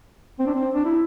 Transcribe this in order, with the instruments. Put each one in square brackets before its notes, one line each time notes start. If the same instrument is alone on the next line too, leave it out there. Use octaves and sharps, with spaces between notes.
[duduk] C4
D4
C4
D4
E4